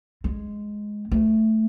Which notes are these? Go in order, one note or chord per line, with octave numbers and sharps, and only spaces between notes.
G#3
A3